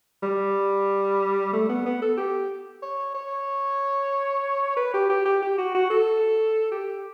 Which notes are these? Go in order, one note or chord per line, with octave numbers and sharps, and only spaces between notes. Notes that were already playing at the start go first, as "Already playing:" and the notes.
G3
A3
B3
B3
A4
G4
C#5
C#5
B4
G4
G4
G4
G4
F#4
F#4
A4
G4